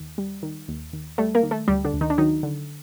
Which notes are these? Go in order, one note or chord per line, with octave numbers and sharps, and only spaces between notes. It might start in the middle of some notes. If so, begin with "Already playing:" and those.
Already playing: D#2
G3
D#3
D#2
D#2
G3 A3 A4
A#3 A#4
D#3
A3 A4
D2 G3 G4
D3 D4
D2
D#3 D#4
D4
D#3 F#3 D#4
D3